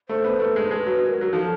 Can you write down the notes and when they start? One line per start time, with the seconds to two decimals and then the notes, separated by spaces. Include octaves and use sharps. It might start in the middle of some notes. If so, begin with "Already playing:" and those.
0.09 A3 C5
0.24 B3
0.40 A3
0.56 G#3
0.71 G#3 C5
0.76 B4
0.86 F#3
1.03 B4
1.06 A#4
1.21 F#3
1.33 F3 A4